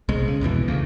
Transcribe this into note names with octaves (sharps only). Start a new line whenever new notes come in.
B1 C3 G#3
C#3
C2 F2 B2 E3
D2 C#3 A#3